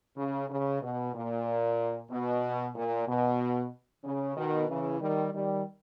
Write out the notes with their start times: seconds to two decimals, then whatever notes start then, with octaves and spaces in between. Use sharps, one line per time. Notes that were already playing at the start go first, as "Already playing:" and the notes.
0.17 C#3
0.49 C#3
0.81 B2
1.14 A#2
2.11 B2
2.75 A#2
3.07 B2
4.04 C#3
4.36 B2 D#3
4.69 C#3 E3
5.01 D#3 G3
5.33 D#3 G3